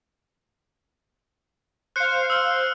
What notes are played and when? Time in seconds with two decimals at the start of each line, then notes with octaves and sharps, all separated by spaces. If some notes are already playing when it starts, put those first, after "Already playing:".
1.96 C5 F5 F#6 C#7
2.30 E6 F6